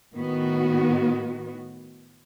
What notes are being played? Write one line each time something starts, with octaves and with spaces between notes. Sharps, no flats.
A2 D#3 B3 F#4